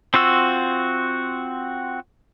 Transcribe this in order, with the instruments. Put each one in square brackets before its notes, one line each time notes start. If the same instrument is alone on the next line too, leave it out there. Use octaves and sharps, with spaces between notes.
[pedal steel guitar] C4 F4 F#4 E6